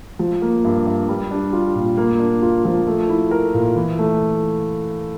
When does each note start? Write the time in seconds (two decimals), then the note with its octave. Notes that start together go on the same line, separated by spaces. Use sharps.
0.19 F3
0.42 A#3
0.64 G2
0.87 G2
1.09 G3
1.31 D4
1.53 F4
1.76 A#2
1.97 A#3
2.20 D4
2.42 F4
2.65 F3
2.87 A3
3.09 E4
3.31 A#4
3.54 A#2
3.76 E3
3.98 A3